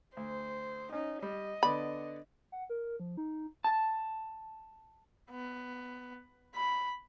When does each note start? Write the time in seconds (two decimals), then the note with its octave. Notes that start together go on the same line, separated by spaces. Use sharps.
0.17 D2 C5
0.93 C#4 D#4
1.22 G3 D#5
1.63 D3 B3 D5 B5
2.52 F#5
2.70 A#4
3.00 F3
3.17 D#4
3.64 A5
5.31 B3
6.55 B5